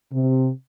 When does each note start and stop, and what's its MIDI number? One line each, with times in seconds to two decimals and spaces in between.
0.13 0.50 48